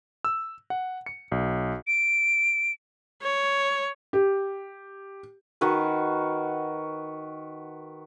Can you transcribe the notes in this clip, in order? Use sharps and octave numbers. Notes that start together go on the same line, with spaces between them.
E6
F#5
C#7
B1
D7
C#5
G4
D#3 F#4 A#4 B4